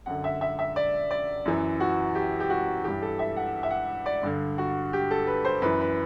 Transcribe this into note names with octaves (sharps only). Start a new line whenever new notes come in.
F#2 D3 F#5
E5
E5
E5
D5
D5
F#2 E3
F#4
G4
G4
F#4
G2 E3 G4
A4
E5
F#5
E5
F#5
D5
G2 D3
F#4
G4
A4
B4
C5
F#2 E3 B4
B4